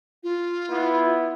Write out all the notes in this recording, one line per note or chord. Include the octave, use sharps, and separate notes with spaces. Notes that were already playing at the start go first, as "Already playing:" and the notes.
F4
B3 E4